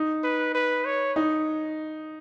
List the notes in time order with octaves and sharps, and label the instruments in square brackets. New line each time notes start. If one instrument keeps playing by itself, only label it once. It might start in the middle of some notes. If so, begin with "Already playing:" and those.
Already playing: [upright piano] D#4
[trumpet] B4
B4
C#5
[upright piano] D#4